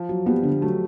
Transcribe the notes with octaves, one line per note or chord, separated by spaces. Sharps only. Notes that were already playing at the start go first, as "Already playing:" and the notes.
Already playing: F3
F#3
G3 B3
D3
F#3 A3